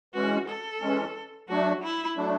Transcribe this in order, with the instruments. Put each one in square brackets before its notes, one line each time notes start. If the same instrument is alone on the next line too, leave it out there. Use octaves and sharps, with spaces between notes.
[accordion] E3 G#3 C#4 [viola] F#4
[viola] A4
[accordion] E3 G#3 C#4
[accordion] F#3 A3 D4 [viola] F#4
[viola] E4
[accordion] F#3 A3 D4